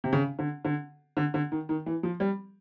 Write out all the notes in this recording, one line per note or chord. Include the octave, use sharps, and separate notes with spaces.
C3
C#3
D3
D3
D3
D3
D#3
D#3
E3
F3
G3